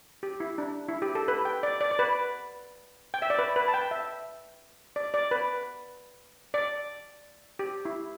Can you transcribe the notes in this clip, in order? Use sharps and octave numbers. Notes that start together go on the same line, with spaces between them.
G4
E4
D4
E4
G4
A4
B4
G5
D5
D5
D5
B4
G5
E5
D5
B4
B4
A5
G5
E5
D5
D5
B4
D5
G4
E4